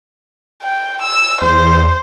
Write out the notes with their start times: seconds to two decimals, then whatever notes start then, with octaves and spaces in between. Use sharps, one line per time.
0.63 G5
1.02 E6
1.42 E2 C5